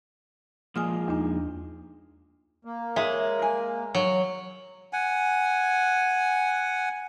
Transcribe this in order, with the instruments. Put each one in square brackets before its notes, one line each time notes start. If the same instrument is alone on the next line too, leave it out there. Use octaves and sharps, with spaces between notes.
[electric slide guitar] A#2 F3 G#3 [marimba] G#5 D#6 F6
[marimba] E2 D4 [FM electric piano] D#4
[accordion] A#3
[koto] G#3 [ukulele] G#4 C#5 E5
[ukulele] A#4 G#5
[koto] F#3
[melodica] F#5 G#5